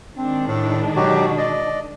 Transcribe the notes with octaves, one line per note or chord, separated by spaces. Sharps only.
D#3 G#3 C4 D4
A2
B2 F#3 F#4 G4
D5 D#5